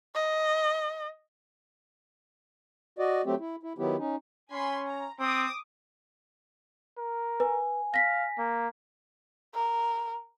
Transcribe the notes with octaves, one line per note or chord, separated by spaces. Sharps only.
D#5
F#4 D5 D#5
F#3 A3 C4 G4
E4
E4
D#3 F#3 B3 E4 G4
C#4 D#4
C#4 G#5 B5 C6
A#5
C4 D6 D#6
A#4
B4 G#5
F5 A#6 B6
A#3
A#4